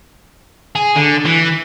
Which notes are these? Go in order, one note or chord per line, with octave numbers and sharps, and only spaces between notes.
G#4
D3
E3